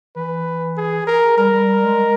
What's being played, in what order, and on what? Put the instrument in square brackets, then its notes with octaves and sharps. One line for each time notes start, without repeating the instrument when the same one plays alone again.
[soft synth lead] E3 [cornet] B4
[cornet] G#4
A#4
[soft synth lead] G3 [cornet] A#4
[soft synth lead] G3
G3
G#3